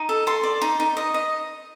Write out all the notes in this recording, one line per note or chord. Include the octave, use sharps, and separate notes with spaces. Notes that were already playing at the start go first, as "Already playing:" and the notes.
Already playing: D#4
A4
A4 C6
D5
D#4
D#4
D#5
D#5